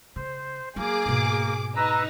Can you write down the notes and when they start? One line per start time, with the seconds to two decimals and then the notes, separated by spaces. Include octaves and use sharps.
0.16 C#3 C5
0.76 F#3 A#3 G#4 D6
1.06 G#2 B2
1.76 D#4 B4 A#5 E6